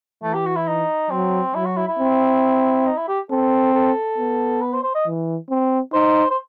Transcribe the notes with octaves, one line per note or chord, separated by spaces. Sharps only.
E3 A3
G4
F#4
E4
D#4
F#3 C4
F#3 E4
F#4
E4
E4
C4
D#4
E4
G4
C4 A4
A4
B3
B4
C5
C5
D#5
E3
C4
D#4 C5
C5